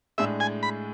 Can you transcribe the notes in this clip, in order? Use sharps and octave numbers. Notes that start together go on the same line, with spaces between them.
A2 G#3 D4 G#4 E5
G#5
B5